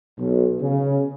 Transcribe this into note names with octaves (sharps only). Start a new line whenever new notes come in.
B1
C#3